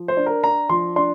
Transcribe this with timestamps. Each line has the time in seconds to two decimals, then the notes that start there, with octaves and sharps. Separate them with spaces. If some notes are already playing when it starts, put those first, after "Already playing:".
Already playing: F3
0.08 C5
0.17 D4
0.26 A#4
0.44 D4 A#5
0.69 F3 C6
0.96 D4 C6